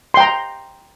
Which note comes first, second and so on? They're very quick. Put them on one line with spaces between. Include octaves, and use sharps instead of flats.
C6 G5 A#5